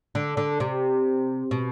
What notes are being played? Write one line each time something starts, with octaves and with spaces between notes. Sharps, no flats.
D3
D3
C3
B2